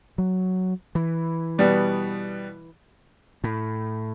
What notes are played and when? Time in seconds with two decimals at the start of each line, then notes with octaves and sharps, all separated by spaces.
0.18 F#3
0.95 E3
1.58 B2 G3 B3
3.44 A2